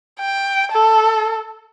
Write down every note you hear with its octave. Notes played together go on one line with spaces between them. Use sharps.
G5
A4